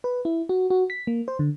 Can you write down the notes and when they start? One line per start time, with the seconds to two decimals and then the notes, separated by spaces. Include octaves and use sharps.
0.04 B4
0.25 E4
0.49 F#4
0.70 F#4
0.90 B6
1.07 A#3
1.28 C5
1.39 D3